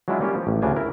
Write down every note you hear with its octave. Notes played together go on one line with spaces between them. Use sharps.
F#3 G#3 C#4 D4 E4 F4
G3 A#3 C#4 F4 G4
F3
A1
D2 C#3 D4 G#5
E4 A#4